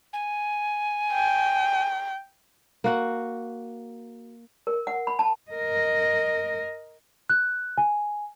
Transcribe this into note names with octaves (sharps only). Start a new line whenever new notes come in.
G#5
G5
A#3 F#4 F#5
A#4
F#5
B5
A5
A#4 D#5
F#6
G#5